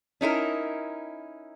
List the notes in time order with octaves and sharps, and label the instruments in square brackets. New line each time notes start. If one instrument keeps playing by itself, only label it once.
[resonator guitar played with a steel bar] C#4 D#4 E4 A#4